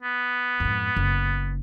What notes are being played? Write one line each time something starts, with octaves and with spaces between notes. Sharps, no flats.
B3
F2 G#2
F#1